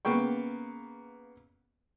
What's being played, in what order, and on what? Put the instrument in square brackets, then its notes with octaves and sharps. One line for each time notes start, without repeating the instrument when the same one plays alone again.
[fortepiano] C#3 A#3 B3 G5 C#6